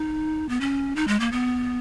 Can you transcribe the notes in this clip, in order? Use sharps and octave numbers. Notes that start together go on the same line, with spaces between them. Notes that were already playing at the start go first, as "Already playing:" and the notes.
Already playing: D#4
B3
C#4
D#4
G#3
A#3
B3